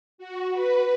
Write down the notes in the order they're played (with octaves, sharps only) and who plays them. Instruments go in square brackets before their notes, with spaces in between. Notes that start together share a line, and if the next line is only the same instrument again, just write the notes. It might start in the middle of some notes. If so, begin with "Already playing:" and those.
[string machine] F#4
B4